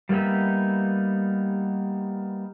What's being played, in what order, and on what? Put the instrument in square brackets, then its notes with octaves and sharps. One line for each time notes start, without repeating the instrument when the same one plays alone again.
[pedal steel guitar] G3 A#3 B3 D#4 E5